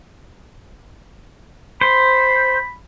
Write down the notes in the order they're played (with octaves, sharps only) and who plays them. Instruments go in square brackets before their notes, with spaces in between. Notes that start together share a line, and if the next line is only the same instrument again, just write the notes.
[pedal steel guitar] C5 [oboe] B5